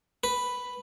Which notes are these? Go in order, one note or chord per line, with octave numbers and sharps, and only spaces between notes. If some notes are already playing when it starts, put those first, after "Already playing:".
B4